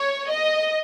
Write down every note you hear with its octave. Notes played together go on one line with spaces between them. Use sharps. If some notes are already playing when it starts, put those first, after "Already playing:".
Already playing: C#5
D#5